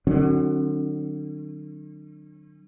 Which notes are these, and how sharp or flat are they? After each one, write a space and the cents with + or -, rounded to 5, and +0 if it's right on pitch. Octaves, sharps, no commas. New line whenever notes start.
D3 +40 F#3 +5 C#4 -40